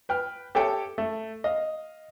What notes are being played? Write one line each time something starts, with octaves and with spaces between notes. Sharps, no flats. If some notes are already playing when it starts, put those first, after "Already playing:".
B4 G5 F6
G4 A4 C#5 E5 G5 A5
A3
D#5 F5